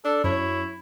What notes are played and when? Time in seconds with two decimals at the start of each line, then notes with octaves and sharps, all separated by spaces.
0.05 D4 A4
0.24 F#2 E4 C#5